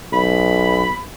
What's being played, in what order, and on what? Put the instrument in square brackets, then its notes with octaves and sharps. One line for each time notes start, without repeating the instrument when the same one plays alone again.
[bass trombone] B1 [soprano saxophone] B5